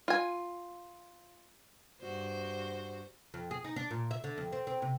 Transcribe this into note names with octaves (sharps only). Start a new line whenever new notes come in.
F4 G#5
G2 F#4 C5
F2
G#4
D#4
D4
A#2
E5
D3
F2
C4
C4
C3